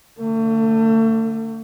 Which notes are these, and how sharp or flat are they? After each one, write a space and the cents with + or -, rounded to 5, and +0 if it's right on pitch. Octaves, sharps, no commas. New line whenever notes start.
D3 +0 A3 +35